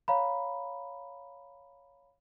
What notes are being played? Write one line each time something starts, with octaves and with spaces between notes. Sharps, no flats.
C#5 F5 A#5 B5